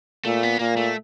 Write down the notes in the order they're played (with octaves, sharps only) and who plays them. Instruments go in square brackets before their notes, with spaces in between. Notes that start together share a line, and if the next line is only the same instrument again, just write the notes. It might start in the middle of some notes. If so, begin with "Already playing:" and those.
[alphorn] A#2 [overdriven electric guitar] A3
[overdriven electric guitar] B3
[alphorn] A#2 [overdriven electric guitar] A#3
[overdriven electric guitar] A3